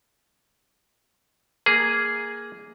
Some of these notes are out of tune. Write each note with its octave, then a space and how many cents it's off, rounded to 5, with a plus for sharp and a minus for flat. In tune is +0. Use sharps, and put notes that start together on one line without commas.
A#3 +0 G#4 +0